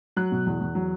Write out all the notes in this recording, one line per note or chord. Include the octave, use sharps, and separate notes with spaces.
F#3 F#6
B2
E2
E2
F#3